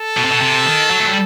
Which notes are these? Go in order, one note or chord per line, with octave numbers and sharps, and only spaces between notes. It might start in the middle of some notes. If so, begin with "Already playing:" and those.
Already playing: A4
B2
C3
B2
C3
D#3
F#3
A3
G3